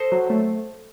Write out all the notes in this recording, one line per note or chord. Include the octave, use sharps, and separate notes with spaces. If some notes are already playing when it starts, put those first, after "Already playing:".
Already playing: A4 C5 D#5
F#3
A3